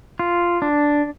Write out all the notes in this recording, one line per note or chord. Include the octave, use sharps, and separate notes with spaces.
F4
D4